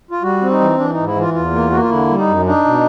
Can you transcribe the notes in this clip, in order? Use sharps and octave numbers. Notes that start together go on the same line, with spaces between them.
F4
G3 F#4
C4
D#4
E3
E3 D4
G#2 D#4
E4
E3 F4
E2 F4
A#3
A#3 F#4
F4
D3 E4
G3
D#4
F#2
D4 D#4
B2